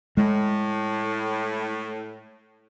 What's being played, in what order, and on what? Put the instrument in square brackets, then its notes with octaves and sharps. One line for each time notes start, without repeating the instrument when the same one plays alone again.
[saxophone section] A2 [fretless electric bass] G#3